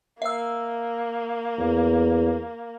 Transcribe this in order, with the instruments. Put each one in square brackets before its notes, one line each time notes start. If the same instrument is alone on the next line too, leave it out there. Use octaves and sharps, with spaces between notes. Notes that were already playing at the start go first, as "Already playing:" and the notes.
[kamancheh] A#3 [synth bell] E5 E6
[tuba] E2